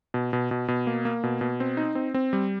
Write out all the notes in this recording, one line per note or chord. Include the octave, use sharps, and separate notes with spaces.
B2
B2
B2
B2
A#3
A#3
B2
B2
C4
D#4
C4
C4
G3